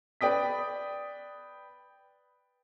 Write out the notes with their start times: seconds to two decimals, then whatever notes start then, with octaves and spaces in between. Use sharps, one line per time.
0.21 B4 D5 G5 D#6 B6